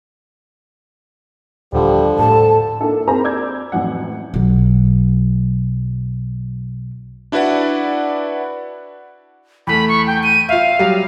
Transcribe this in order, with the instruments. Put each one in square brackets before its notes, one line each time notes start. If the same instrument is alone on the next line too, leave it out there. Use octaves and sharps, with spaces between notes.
[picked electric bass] D#1 [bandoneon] D3 F3 [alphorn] G3
[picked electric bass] A2 [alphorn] A4 [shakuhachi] A5
[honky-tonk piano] A#3 D4 E4 A4
C4 G#4 A#4 C5 A#5 B5
D5 D6 E6 G6 G#6
A1 F2 F#3 F#5
[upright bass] B1 F#3
[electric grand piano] D4 E4 F#4 B4 D5 F#5
[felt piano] E2 A3 [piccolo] B5
[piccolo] C#6
G5
D#7
[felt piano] F4 E5 [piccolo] F5
[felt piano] F#3 G3